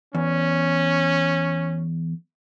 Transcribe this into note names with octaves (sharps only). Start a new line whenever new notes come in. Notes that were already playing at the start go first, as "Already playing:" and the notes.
E2 C#4